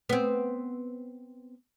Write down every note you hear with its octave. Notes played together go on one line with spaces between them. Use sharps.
B3 C4